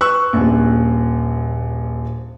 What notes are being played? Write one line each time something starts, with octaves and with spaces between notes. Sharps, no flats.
B4 C#6 E6 F#6
D#1 A#1